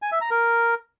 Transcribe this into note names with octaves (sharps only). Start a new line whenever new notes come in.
G#5
E5
A#5
A#4